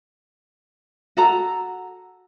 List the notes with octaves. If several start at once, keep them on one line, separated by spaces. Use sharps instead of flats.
F#4 A4 A#5